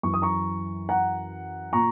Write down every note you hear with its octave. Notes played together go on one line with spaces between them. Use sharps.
F#2 E3 C#6
D#6
A#5 C#6
F#5 A#5
A#2 A#5 C#6